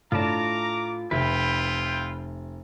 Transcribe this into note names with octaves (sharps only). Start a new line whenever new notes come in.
A2 D4 F4 A5 A#5 D6
F1 E4 F4 B4 E5 G5